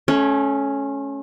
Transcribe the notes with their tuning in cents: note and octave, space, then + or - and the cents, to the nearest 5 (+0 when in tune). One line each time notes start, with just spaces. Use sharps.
A3 -30 C#4 +0